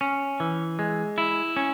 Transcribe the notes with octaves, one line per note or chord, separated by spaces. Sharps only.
C#4
E3
G#3
E4
C#4